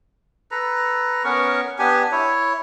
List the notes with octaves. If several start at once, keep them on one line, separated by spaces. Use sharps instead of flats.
A4 B4 A#5
B3 C#4 A#4 C#6
B3 D4 G4 G#5
E4 C#5